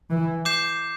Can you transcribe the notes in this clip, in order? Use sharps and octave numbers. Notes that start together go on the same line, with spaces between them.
E3
D6 G6 C7 E7